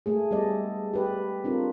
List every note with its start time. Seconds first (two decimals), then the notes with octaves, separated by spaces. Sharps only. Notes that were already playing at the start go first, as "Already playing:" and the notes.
0.06 G#3 A3 G#4
0.31 G3 G#3 B3 A4 D5 D#5
0.94 G4 B4 D5
1.44 C4 D4 F4 A#4